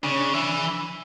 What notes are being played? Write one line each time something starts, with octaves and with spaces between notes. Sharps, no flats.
C#3 D4
C#4
D4
E3 D4